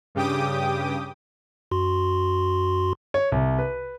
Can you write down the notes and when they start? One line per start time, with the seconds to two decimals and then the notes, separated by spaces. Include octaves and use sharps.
0.15 G2 C#3 G4 G5 D6 D#6
1.71 F#2 F#4 C6
3.14 C#5
3.32 C2
3.58 B4